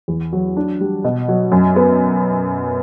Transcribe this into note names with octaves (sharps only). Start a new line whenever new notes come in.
E2
F#3
D4
G3
B2
F#3
F#2
B3